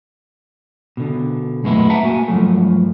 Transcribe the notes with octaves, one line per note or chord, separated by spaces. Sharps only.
B2 D3
F#2 A#2 G#3 A3 B3 E4
E5 F#5 A5 A#5
A#3 F#4 G#5
G2 F3 F#3 A3